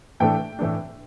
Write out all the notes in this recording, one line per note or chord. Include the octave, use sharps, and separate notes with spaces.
A2 E3 A3 D4 G5
A2 E3 A3 D4